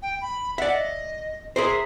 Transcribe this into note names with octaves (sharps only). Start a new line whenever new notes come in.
G5
B5
D5 E5 F#5
D#5
G#4 A#4 C5 E5